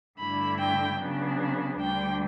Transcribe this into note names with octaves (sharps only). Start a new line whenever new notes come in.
G2 D3 A3 E4 B5
G5
C#3 F#3 B3 D4
D2 D3 G3 G5